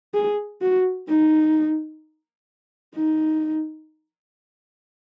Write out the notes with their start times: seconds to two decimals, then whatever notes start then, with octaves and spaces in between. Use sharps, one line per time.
0.14 G#4
0.61 F#4
1.09 D#4
2.95 D#4